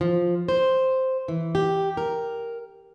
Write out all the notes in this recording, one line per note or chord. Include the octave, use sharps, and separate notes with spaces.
F3
C5
E3
G4
A#4